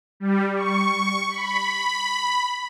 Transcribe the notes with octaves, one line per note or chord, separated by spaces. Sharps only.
G3
C#6
B5